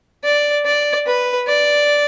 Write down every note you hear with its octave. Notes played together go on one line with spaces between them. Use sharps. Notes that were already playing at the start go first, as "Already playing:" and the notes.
D5
D5
B4
D5